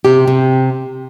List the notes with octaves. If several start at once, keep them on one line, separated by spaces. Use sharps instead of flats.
C3 G4
C3